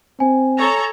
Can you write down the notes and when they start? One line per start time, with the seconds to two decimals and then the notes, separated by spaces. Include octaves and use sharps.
0.20 C4 G#5
0.58 A4 C#5 A#5